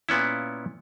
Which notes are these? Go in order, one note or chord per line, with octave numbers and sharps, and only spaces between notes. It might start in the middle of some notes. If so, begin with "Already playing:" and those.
A#2 B3 C#4 E4